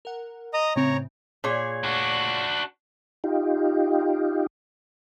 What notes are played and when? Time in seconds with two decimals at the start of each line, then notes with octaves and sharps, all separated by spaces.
0.05 A#4 F#5
0.54 D#5 A#5 D#6
0.76 A2 C#3 C4 C#5 A#5
1.44 A#2 G#4 C#5
1.84 D4 F#4
3.24 D#4 F4 G4